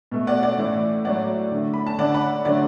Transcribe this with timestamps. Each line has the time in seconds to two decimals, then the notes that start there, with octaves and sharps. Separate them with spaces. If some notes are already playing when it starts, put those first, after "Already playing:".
0.12 B2 A3
0.27 D5 F#5
0.43 D5 F#5
0.58 A2 E3 A3
1.05 A2 F#3 A3 D5 F#5
1.51 D3 A3
1.74 B5
1.87 A5
1.99 D3 A3 D5 F#5
2.14 F#5 B5
2.45 D3 F#3 A3 D5 F#5